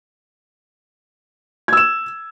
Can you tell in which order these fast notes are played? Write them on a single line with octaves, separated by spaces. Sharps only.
G#6 E6 E7